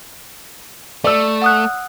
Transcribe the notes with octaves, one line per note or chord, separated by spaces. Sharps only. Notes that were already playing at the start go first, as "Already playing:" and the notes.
A3 D5 E6
F#5 D#6 F#6